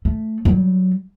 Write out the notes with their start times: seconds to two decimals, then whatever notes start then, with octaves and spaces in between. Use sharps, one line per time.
0.05 A3
0.45 F#3 G3